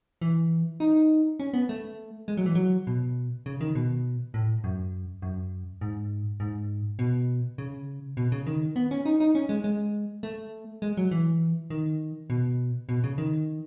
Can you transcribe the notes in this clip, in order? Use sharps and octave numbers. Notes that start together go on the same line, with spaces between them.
E3
D#4
C#4
B3
A3
G#3
F#3
E3
F#3
B2
C#3
D#3
B2
A2
F#2
F#2
G#2
G#2
B2
C#3
B2
C#3
D#3
B3
C#4
D#4
D#4
C#4
G#3
G#3
A3
G#3
F#3
E3
D#3
B2
B2
C#3
D#3